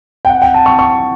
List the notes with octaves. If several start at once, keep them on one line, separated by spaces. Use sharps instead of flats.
G5
F#5
G5
A5
C#6
C#6